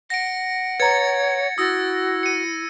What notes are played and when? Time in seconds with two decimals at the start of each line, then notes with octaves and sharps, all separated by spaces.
0.10 F#5 A#6 D7
0.80 B4 C#5 A#5 G#6 A6 C#7
1.58 E4 F#4 D#6 E6 A6 A#6
2.23 C#7 D#7